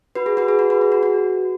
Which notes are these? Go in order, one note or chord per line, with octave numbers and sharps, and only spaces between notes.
F#4 B4
G#4
F#4 B4
G#4
F#4
F#4 B4
G#4
F#4
F#4